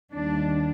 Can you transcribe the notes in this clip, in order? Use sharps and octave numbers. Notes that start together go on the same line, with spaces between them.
D#2 D#3 G3 D4